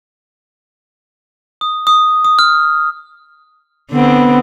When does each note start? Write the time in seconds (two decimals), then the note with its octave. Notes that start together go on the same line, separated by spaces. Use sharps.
1.61 D#6
1.87 D#6
2.25 D#6
2.39 F6
3.92 D3 B3 C4